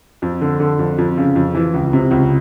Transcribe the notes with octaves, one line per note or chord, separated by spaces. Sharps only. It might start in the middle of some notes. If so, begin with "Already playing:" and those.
F2
D3
D3
F2
F2
C#3
F2
E3
C#2
C3
C#2